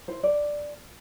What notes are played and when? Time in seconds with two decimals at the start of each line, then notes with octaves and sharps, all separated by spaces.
0.08 E4 C5
0.23 D5